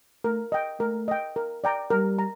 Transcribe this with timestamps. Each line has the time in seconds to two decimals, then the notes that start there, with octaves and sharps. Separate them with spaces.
0.24 A3 A#4
0.52 D#5 G5
0.79 A3 A#4
1.08 D#5 G5
1.36 A#4
1.64 D5 G5 A#5
1.90 G3 A#4
2.19 A#5